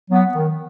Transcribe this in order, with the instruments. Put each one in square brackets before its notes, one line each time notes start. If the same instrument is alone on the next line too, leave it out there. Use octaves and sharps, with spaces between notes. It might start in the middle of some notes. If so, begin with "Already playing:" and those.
[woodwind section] F#3 B3
D#3